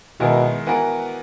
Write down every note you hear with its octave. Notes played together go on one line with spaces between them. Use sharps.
B2 D#3 G#3 B3 E4 A#4
E3 B3 F#4 A#4